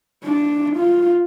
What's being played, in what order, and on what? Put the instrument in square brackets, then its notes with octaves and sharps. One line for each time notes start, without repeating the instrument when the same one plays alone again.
[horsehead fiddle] D4
F4